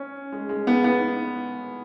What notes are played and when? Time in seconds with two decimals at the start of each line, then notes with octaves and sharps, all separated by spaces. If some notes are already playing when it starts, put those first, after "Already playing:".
Already playing: C#4
0.32 G#3
0.49 G#3
0.67 B3
0.84 B3